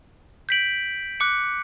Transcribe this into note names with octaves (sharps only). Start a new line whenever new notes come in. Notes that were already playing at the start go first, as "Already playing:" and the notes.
G6 B6 D7 F#7
D6 F#6 C#7